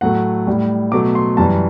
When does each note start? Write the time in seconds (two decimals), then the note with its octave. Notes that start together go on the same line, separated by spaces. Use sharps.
0.01 A2 F#3 A3 F#5
0.47 A2 G3
0.92 B2 F#3 A3 D6
1.15 C6
1.37 F#2 E3 G3 A5